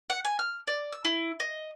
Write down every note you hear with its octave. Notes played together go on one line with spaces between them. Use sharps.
F#5
G#5
F6
D5
E6
E4
D#5